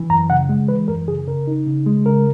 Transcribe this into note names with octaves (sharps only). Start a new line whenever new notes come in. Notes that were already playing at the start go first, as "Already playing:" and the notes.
Already playing: E3
F#2 A#5
C#3 F#5
G#3
E3 B4
F#2 A#4
C#3 G#4
C#3 A#4
D#4
C#3
G#3
C#3 A#4